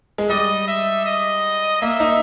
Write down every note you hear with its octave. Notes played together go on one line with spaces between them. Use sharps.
G#3
G3 D#5
E5
D#5
A#3 E5
D#4